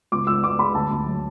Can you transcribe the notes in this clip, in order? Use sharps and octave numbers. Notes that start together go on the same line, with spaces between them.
C#2 D6
C#2 E6
C#2 D6
G#3 B5
D2 A5
D2
F#3